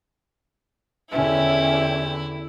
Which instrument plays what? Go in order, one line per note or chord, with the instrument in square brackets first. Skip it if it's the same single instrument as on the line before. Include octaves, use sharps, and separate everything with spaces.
[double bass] E2 D3 [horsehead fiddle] C#4 G4 [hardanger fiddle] E4 [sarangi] E5